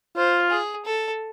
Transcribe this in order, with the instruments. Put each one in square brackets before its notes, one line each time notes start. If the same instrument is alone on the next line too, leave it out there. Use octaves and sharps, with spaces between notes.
[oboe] F4 [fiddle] C5
[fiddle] G#4
A4